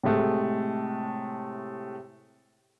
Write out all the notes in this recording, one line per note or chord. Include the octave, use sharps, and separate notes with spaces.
A2 C3 G#3 A3